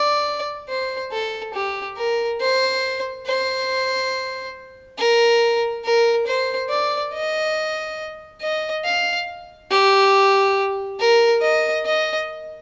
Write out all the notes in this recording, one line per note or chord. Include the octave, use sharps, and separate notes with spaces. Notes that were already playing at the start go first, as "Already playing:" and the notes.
Already playing: D5
C5
A4
G4
A#4
C5
C5
A#4
A#4
C5
D5
D#5
D#5
F5
G4
A#4
D#5
D#5